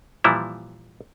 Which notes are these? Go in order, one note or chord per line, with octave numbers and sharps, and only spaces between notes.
A#2 E3 F3 G3 E4